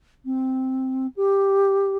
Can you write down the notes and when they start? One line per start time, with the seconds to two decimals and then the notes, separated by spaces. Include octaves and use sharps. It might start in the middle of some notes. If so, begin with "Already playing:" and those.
0.25 C4
1.16 G4